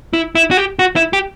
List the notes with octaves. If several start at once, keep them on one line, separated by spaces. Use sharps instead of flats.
E4
E4
F#4
G4
F#4
E4
G4